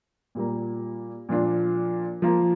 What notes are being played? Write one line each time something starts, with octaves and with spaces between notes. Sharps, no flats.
A#2 G3 A#3
A#2 F3 D4 F4
F3 A#3 F4